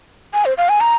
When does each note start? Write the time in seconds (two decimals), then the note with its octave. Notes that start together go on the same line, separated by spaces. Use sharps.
0.34 G#5
0.45 C5
0.58 F5
0.69 G#5
0.81 A#5